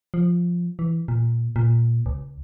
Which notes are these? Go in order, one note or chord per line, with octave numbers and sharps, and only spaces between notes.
F3
E3
A#2
A#2
C#2